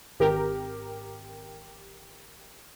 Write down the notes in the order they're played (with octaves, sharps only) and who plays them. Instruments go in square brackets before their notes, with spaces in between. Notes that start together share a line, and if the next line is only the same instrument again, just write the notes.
[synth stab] G#1 G4 A#4